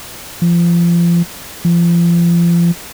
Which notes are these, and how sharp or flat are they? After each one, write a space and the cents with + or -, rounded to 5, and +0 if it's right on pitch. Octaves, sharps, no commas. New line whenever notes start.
F3 -30
F3 -35